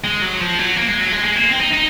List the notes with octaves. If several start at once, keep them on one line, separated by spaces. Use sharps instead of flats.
G#3
F#3
F3
F#3
A#3
G#3
F#3
G#3
G#3
A#3
C4
D#4
D#4